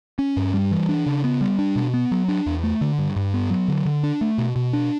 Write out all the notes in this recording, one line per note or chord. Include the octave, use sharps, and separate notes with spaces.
C#4
G2
G3
E3
D4
C#3
B3
G3
D4
B2
B3
F#3
D4
E2
A3
D3
G2
G2
B3
F#3
D3
D3
D4
A3
B2
B2
D4